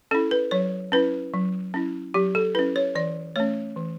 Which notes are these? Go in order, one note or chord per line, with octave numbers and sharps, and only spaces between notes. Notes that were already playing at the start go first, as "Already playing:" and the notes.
C#4 E4 A4
B4
F#3 C#5
C#4 E4 B4
F#3
C#4 E4
F#3 G4
A4
C#4 E4 B4
C#5
E3 D5
A3 C#4 C#5
E3